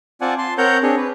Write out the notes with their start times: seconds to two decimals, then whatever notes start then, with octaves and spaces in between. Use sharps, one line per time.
0.21 C4 F4 D5 F#5 G#5 A5
0.38 A5 C6
0.58 C4 A#4 C#5 F#5 A#5 G6
0.83 C4 D4 G#4 C#5
0.97 B4